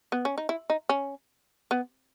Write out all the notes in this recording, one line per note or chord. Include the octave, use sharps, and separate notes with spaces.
B3
C#4
D#4
E4
D#4
C#4
B3